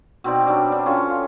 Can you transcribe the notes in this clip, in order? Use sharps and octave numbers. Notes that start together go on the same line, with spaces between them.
B2 C4 D#4 D5
F#3 G3 D4
D4
C#4 F4 A4
F4